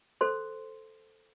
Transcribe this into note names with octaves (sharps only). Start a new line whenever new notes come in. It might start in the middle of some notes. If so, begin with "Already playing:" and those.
A4 C5 C6